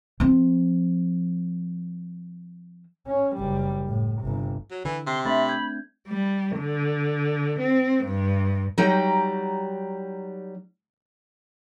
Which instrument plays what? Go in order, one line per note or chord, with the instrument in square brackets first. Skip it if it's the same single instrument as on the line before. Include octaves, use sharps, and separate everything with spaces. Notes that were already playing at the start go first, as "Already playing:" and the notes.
[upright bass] F3 C4
[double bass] C#4
F#1 G3
A2
G1 C3
[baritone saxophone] F#3
[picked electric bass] D3 [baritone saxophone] E3
[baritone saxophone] C3 [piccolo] C6
[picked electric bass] A3 C4 D4 [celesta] E5 C6 A6 [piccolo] B5
[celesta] G6 G#6
[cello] G3
D3
C4
G2
[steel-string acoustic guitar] F#3 G3 D#4 G5 A#5